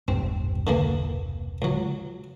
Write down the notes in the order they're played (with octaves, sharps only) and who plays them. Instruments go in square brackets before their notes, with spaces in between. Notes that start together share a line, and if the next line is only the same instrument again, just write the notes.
[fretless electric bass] E1 C2 G2 [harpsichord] C4
[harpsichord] D3 E3 A#3
C#2 F#3